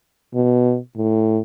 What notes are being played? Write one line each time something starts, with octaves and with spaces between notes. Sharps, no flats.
B2
A2